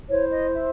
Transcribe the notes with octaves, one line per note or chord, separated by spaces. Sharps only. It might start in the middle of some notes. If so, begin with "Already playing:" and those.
E4 C5 C#5
D#5
E5